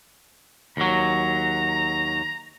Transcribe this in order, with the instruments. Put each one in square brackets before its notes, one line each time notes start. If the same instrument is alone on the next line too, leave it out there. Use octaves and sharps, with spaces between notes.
[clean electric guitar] D#2 F#3 [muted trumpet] A#5